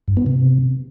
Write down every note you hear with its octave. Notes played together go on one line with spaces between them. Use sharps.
G2
B3
C3